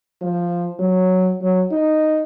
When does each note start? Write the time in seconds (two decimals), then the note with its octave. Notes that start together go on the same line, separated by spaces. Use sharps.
0.21 F3
0.79 F#3
1.42 F#3
1.72 D#4